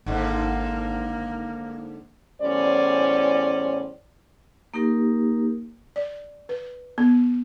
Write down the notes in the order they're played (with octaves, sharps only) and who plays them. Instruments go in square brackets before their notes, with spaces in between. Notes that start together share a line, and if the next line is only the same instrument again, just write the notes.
[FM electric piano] G#1 [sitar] G#2 D3 [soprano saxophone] A#3
[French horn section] E2 A2 G3 C#4 C5 D5
[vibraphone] A#3 D#4 G4 A#4
[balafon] D5
B4
B3